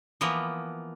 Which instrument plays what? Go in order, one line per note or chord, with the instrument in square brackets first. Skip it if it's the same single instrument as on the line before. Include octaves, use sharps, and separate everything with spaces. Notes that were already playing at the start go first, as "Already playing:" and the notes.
[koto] E3 F3 A#3 B3